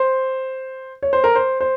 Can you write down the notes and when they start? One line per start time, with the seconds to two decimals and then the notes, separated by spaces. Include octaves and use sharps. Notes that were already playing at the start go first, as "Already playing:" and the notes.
Already playing: C5
1.03 C#5
1.13 C5
1.24 A#4
1.36 C5
1.61 C5